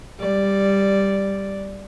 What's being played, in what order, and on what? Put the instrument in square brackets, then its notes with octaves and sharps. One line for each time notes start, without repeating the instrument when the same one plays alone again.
[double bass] G3 [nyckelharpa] D5